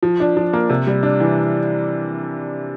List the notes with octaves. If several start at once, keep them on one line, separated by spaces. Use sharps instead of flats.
F3
D4
F3
A#3
C3
G3
D4
E3